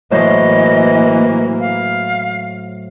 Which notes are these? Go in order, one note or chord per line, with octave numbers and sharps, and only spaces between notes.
A2 E3 F#3 A#3 C5 D#5
F5